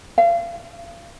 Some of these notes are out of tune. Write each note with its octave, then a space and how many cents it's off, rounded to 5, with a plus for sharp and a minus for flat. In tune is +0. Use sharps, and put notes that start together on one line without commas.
F5 -35